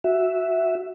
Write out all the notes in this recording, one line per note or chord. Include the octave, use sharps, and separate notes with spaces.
F#4 E5